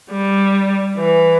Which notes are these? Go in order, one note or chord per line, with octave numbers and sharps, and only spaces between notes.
G3
E3